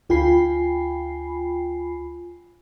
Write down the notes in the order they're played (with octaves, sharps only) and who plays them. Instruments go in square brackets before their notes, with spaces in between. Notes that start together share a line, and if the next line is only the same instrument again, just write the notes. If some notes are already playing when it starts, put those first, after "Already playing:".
[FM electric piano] D2 F4 G5 G#5 B5 C7